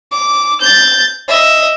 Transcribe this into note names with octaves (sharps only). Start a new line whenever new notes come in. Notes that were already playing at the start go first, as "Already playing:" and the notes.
D6
G6 A6
D#5 E5